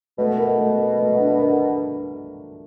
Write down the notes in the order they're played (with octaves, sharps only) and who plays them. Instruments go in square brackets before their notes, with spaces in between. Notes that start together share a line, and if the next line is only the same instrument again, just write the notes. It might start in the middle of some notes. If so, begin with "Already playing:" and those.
[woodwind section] B2 [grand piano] A3
[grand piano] A#4
A3
A#4
A3
D4
A#4